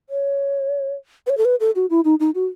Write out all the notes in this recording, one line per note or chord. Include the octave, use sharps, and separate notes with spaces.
C#5
B4
C#5
A4
B4
A4
F#4
E4
D#4
D#4
F#4